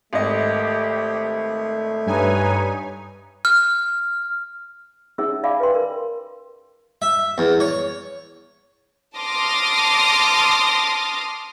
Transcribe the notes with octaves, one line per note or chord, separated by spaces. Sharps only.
G#1 A3 G4 D#5
G2 D#4 B4 C#5 G#5
F6
C#4 D#4 G#4 C#5 E5 E6
D5 E5 F5 G#5 B5 D6
B4 C#5 G5 C6
A#4
E5
E2
C#5
A5 C6 D6 D#6 F6 A#6